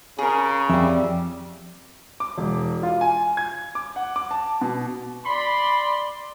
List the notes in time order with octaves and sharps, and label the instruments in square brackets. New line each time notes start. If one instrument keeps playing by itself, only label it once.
[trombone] C#3 [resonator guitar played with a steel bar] G#4 A#4
[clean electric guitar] F2 [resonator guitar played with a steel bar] G3 E5
[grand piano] D6
E1
F4
G#5
G#6
D6
F#5
D6
A5
B2
[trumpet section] D5 B5 C6